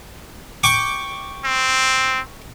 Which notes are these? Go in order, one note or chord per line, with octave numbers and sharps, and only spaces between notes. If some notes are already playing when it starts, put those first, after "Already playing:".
G5 C#6 D6
C4